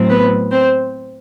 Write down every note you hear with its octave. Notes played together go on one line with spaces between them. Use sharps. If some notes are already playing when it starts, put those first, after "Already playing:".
Already playing: A2 F#3 C4
B3 B4
C4 C5